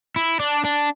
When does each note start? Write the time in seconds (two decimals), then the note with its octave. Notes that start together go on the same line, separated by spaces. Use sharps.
0.16 E4
0.40 D4
0.65 D4